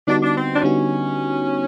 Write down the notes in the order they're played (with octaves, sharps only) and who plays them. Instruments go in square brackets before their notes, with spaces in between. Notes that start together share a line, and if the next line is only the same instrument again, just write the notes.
[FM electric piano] D3 G3 B3 D#4 F#4 [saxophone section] D4
[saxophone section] D4
C4
D4
[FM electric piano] D3 G3 B3 D#4 F#4 [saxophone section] C#4